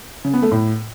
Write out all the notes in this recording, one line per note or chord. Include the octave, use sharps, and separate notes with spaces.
C#3
B3
A3
A2